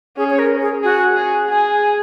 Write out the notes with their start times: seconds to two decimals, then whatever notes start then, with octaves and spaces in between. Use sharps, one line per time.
0.17 C#4 G#4
0.30 C#5
0.39 A#4
0.62 G#4
0.83 F#4 G#4
1.16 G#4
1.49 G#4 G#5